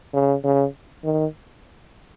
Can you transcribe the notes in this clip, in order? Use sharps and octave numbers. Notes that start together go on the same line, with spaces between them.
C#3
C#3
D#3